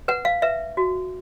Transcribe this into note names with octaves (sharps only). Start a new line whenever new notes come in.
B4 F#5
F5
B4 E5
F#4